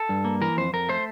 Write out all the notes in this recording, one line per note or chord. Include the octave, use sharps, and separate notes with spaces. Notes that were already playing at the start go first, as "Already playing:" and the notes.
Already playing: A4
G2
A#3
E3 A#4
F2 C5
F2 A#4
A3 C5